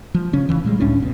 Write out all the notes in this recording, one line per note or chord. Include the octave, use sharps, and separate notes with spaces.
F3
C#3 C#4
E1 G#2 C#3 E3
A#2 G3 G#3
C#2 A2 C#4 D4
F1 B2